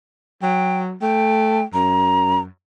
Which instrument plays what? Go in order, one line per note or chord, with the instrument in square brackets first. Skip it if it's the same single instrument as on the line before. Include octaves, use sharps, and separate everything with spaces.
[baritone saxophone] F#3 [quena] G5
[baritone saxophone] A3 [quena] G5
[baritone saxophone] F#2 [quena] A#5